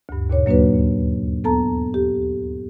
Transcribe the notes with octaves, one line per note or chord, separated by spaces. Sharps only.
D2 G2
D#2 A#2 C#5
F#3 A#3 D4 F#4 B4
B3 A4 A5 A#5
G4